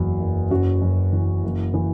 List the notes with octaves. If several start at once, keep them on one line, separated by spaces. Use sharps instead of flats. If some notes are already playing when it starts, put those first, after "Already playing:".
Already playing: F#1 E2 F#3
F#1
F#1 C#4 F#4
F#2
E3
F#1
E3